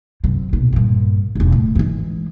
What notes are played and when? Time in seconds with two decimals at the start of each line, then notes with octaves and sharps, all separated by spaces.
0.24 F#2 C3
0.53 A#1 B2
0.73 G2 A#2
1.35 E1 A#1
1.52 A2
1.75 E3 G#3